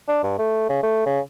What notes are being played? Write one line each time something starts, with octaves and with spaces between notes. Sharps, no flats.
D4
G2
A3
C#3
A3
C#3